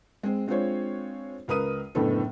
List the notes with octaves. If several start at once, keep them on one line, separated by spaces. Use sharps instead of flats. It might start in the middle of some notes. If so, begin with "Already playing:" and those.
G#3 C4
G#3 C4 D4 F4 C5 C#5
C#2 A#4 B4 D#6 D#7
F#1 A2 D3 B3 A4